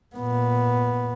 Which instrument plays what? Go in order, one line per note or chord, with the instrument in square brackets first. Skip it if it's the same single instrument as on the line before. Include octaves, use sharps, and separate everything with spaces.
[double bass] A#2 B3